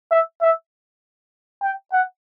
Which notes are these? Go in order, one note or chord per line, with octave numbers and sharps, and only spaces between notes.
E5
E5
G5
F#5